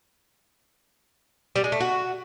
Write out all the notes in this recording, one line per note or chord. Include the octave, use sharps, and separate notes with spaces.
G3
G#3
A3
F#4